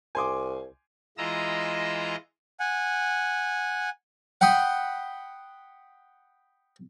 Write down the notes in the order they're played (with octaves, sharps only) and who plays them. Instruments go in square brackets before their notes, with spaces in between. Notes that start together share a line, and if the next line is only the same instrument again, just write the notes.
[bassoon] C2 [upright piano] G#5 C6 D6
[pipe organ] E3 G#3 F4 D#5 A#5 E6
[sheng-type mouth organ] F#5 G#5
[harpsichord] F#5 G5 B5 C6 D#6